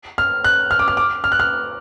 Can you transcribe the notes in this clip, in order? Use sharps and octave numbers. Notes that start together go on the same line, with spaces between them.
F6
F#6
F6
D6
F6
D6
F6
F#6
F6